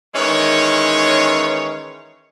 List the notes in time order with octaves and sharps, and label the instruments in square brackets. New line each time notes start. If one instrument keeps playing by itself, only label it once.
[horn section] D#3 E3 G#3 C#4 C#5